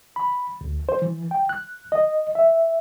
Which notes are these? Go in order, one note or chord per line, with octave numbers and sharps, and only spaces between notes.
B5
D2
C5
E3
G5
F#6
D#5
E5